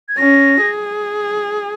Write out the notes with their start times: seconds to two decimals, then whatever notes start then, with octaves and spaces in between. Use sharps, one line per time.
0.09 G#6
0.18 C#4 A#6
0.62 G#4